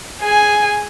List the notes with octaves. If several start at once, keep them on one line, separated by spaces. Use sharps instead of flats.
G#4 G#5